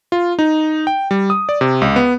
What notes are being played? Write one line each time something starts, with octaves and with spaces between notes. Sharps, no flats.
F4
D#4
G5
G3
D#6
D5
C3
C#2
B3